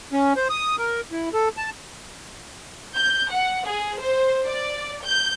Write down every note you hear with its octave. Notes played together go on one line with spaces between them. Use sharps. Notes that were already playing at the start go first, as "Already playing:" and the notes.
C#4
C5
D#6
A#4
E4
A4
A5
G6
F#5
G#4
C5
D5
G6